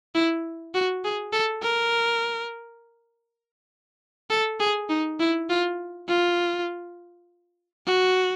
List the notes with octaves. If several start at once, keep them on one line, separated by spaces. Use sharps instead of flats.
E4
F#4
G#4
A4
A#4
A4
G#4
D#4
E4
F4
F4
F#4